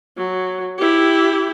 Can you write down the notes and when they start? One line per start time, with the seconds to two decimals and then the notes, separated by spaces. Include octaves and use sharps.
0.17 F#3
0.79 E4 G4